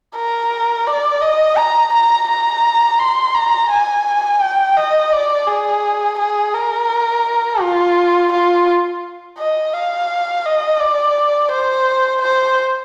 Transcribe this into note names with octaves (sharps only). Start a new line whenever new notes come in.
A#4
D5
D#5
A#5
A#5
A#5
C6
A#5
G#5
G5
D#5
D5
G#4
G#4
A#4
F4
F4
D#5
F5
D#5
D5
C5
C5